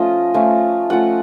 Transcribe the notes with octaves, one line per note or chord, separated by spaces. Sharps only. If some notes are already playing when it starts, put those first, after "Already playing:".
Already playing: F3 A3 C#4 F4 D#5
F3 A3 C#4 F4
F3 A3 C#4 F4 F#5